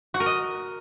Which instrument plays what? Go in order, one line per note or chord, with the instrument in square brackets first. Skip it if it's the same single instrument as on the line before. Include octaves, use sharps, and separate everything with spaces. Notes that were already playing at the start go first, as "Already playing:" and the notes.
[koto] F#4
A#4
D#5